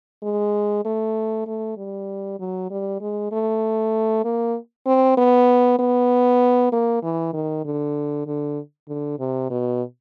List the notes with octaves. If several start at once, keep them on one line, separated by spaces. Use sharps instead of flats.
G#3
A3
A3
G3
F#3
G3
G#3
A3
A#3
C4
B3
B3
A#3
E3
D#3
D3
D3
D3
C3
B2